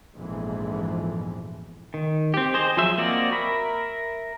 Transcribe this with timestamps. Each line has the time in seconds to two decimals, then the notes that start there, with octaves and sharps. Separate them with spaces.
0.16 A#1 F2 G#2 B2 E3
1.94 D#3
2.34 C4 G4
2.54 G#4 C5 D#5
2.77 F3 F#3 G#4 C5 E5
2.98 A#3 C4 F#4 D5 D#5
3.32 A#4 E5 B5